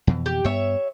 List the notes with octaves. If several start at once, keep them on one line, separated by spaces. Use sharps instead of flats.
F2 B2 E3
G4
G2 B3 C#5 E5